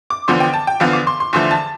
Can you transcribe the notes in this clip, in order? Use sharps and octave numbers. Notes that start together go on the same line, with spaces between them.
D6
E2 D3 F3 B3 C6
G5
A5
G5
E2 D3 F3 B3 F5
D6
C6
C6
E2 D3 F3 A3 C6
A5